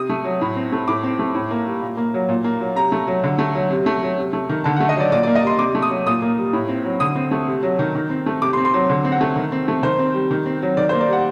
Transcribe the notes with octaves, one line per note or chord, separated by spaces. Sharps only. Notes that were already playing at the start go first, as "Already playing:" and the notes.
Already playing: C3 D#6
A3
F#3
A2
C4
A3
A2 D6
C4
A3
A2
A#3
G3
A#2
A#3
F#3
A#2
A#3
F#3
C3 A#5
A3
F#3
D3
A3
F#3
C3
A3
F#3
C3
A3
D#3
D3 A5
F#5
A3
D#5
F#3 D5
A#2 D5
D5
A#3
D#5
G3 C6
C3 D6
A3
D#6
F#3
A#2 D#6
A#3
G3
A2
C4
F#3
D3 D#6
C4
A3
C3
F#3
D#3
D#3
C4
A3
C3 D6
C6
C4
C6
F#3
D3
C4
F#5
A3
D#3
C4
A3
D#3 C5
C4
G3
D#3
C4
F#3
D#3 D5
C5
A#3
D5
G3 F#5